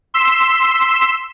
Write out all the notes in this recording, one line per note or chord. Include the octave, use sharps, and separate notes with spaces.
C6 E6 B6 E7